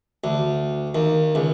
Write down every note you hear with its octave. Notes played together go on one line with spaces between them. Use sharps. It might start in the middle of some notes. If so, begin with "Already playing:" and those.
D2
D#2
C#2